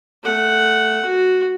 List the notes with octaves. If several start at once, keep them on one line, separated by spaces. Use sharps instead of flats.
A3 F#5
F#4